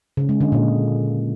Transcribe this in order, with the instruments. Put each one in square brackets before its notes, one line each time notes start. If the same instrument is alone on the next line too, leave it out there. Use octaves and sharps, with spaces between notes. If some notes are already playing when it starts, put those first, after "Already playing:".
[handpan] C#3
G#3
D3
A#2